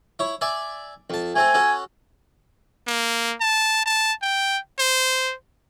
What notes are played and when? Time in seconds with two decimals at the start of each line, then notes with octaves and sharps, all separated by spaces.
0.19 E4 C#5
0.41 D5 E5 G#5
1.10 F2 A5
1.36 A3 C4 A4 G#5
1.54 C#4 F#4 A4
2.87 A#3
3.41 A5
3.86 A5
4.22 G5
4.79 C5